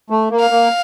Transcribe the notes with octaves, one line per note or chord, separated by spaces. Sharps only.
A3
A#3
F5
A#3